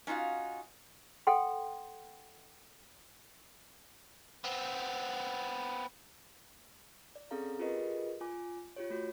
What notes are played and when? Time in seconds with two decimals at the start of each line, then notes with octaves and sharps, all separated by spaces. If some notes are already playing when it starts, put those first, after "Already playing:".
0.07 C#4 D#4 F4 F#4 F5
1.27 A4 F#5 G5 C6
4.44 B3 C4
7.16 D5
7.31 C4 C#4 G#4 A4 F5 A#5
7.59 F4 G4 G#4 A#4 B4 D#5
8.21 F4 G#5 D6
8.76 F4 G4 C#5
8.90 A3 F#4